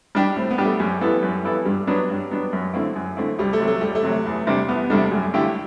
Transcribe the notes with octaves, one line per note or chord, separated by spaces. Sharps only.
G3 D4 G4
A2 C4
B3
G3 D4 G4
A3
F#2 G3
E3 B3 E4 A4
F#2
E3 B3 E4 A4
G2 G3
F#3 B3 D4
G2
F#3 B3 D4
F#2
D3 A3 C4 E4
F#2
D3 A3 C4 E4
C2 G3
A3
C3 F#3
A3
C2 G3
A3
C3 F#3
E2
C3 G3 D4
E2 B3
C3 G3 A3 D4
F#2 G3
D3 A3 E4 G4